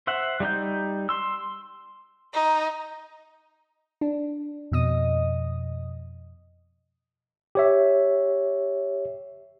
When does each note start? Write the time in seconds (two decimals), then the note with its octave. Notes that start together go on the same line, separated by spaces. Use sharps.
0.07 C5 E5 F#5
0.40 G3 D#4 G6
1.09 C6 E6
2.34 D#4
4.01 D4
4.72 F2 B2 D#5 D#6
7.55 G4 C#5 E5